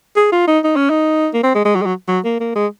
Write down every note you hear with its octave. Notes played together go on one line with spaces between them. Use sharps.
G#4
F4
D#4
D#4
C#4
D#4
A#3
C4
G#3
G#3
F#3
G#3
F#3
F#3
A#3
A#3
G#3